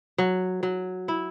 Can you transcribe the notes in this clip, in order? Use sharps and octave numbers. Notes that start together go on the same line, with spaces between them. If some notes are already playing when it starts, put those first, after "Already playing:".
F#3
F#3
E4